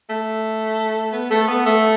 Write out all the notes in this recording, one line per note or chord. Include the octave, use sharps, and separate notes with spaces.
A3
B3
A3
B3
A3